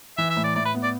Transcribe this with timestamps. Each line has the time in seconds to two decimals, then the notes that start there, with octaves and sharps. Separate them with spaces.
0.18 E3 E5
0.30 E5
0.36 A2
0.44 D5
0.55 A2 D5
0.65 B4
0.75 B3
0.83 D5